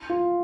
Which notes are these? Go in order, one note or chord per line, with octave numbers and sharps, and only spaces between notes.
F4